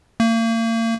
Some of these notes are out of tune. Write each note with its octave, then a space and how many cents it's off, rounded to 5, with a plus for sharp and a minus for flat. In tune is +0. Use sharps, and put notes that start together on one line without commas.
A#3 -40